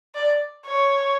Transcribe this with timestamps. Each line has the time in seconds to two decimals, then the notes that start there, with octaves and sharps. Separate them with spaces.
0.15 D5
0.67 C#5